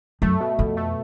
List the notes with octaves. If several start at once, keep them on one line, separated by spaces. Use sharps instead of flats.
F#2 A3
B2
F2 B2
A3